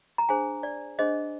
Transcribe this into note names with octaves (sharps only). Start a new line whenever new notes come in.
A#5
D4 G#4 C5 G#5
D5
D4 G#4 C5 D#5